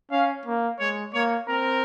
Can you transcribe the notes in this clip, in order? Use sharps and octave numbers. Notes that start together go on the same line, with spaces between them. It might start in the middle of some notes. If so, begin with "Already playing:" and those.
C#4 F5
A#3
G#3 C#5
A#3 C#5
C4 A#4